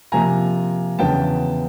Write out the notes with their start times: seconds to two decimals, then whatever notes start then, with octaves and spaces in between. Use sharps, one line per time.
0.12 C3 F3 A#3 G#5 A#5
0.99 E2 C#3 F#3 B3 D4 G5 A5